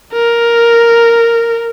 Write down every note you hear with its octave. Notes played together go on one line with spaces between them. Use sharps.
A#4